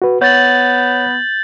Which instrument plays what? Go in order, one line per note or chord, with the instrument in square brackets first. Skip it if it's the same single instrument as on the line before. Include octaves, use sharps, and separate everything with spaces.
[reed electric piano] F#4 B4
[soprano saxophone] B3 [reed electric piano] C#5 [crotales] G6 A6 F#7